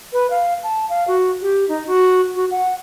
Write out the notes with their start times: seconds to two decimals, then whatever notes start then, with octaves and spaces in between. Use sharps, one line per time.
0.13 B4
0.30 F5
0.63 A5
0.89 F5
1.08 F#4
1.42 G4
1.69 D#4
1.87 F#4
2.36 F#4
2.51 F#5